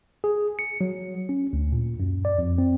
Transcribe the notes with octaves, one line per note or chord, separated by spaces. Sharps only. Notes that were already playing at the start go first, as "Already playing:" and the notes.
G#4
C#7
F#3
C#4
D2
A#2
F#2
D5
F2
C4